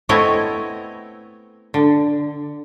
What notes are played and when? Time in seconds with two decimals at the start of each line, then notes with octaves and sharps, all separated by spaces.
0.09 A3 B3 C4 E4 C#5 D#5
1.74 D3